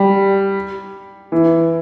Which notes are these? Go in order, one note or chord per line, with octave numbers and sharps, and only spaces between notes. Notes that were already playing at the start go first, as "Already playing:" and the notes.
Already playing: G3
E3